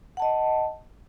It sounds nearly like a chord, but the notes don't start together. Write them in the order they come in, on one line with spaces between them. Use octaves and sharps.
F#5 A5 D#5